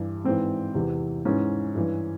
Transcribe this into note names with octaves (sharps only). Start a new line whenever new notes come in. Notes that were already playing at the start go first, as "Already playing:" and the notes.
Already playing: G2 E3
G#2 E3 C4
E2 C3 E3
G#2 E3 C#4
G2 E3